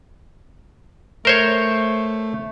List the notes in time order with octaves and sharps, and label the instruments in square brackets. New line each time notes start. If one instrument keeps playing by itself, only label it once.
[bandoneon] A3 [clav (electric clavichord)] A#4 C5 C#5